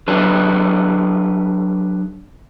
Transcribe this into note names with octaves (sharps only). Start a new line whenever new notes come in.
F#3 D4 G4 A4 B4